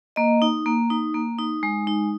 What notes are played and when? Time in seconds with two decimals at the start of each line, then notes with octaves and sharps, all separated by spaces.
0.16 A#3 D#5
0.42 D#4
0.66 A#3
0.90 D#4
1.14 A#3
1.38 D#4
1.63 G#3
1.87 D#4